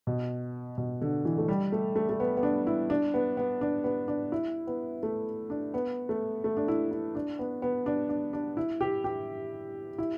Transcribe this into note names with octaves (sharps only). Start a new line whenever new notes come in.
B2
B2
D3
E3
A3
G3
A3
A3
A3
B3
B3
D4
E4
D4
B3
B3
D4
B3
D4
E4
B3
A3
D4
B3
A3
A3
D4
E4
E4
D4
B3
B3
D4
D4
D4
E4
G4
G4
E4